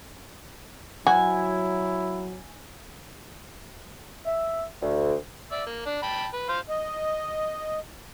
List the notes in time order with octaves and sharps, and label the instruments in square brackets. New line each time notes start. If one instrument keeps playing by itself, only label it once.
[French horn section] F#3 [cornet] E4 [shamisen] F#4 [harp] G#5
[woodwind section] E5
D2
[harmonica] D5 E5
A#3
D4
G5 A5 B5
B4
C5 F5 C6
[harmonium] D#5